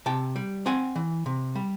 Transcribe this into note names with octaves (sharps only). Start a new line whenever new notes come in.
C3 G5 A5
G3
C4 F#5 G#5
E3
C3
G3